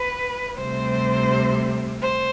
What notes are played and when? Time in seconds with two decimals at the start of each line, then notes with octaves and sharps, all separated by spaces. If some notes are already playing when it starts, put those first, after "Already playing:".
Already playing: B4
0.56 D2 C3 G3 C5
2.02 C5